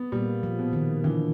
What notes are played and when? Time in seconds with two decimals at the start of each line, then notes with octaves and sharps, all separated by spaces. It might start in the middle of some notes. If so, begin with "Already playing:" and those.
Already playing: B3
0.12 A#2 G3 A#3
0.43 F3
0.59 B2
0.73 D#3
1.04 D3 E3